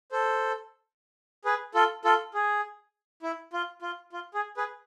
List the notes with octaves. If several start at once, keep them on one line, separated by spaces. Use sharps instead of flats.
A4 C5
G#4 B4
F4 A4
F4 A4
G#4
E4
F4
F4
F4
G#4
G#4 B4